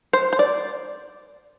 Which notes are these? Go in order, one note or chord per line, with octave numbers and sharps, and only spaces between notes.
C5
C5
D5